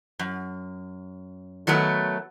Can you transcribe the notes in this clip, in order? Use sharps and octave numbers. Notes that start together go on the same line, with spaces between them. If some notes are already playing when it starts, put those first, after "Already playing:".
F#2
D#3 F#3 A3 B3